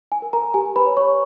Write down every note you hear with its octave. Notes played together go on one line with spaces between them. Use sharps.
G#5
A#4
A#4 A#5
G4 G#5
B4 B5
C#5
C#5 C#6